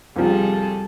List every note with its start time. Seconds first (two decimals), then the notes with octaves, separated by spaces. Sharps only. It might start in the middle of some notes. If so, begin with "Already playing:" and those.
0.16 C2 C3 F3 G3 G#4 A4